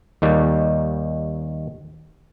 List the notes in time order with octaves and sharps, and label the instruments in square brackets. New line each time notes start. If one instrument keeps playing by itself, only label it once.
[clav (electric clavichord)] D#2 D#3 G3